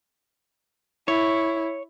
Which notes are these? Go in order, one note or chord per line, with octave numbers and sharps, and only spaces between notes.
E4 C#5